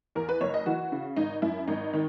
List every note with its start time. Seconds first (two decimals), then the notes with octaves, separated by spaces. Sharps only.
0.15 E2 A#4
0.29 B4
0.41 F#1 C#5
0.54 D#5
0.66 E3 F#4
0.92 C#3
1.16 G#1 D#4
1.42 F#2 E4
1.68 G#1 D#4
1.93 D#3